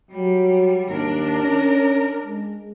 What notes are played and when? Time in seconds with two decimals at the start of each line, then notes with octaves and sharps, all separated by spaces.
0.11 F#3 G3
0.88 D#2 D4 A#4
1.43 C#4
2.24 G#3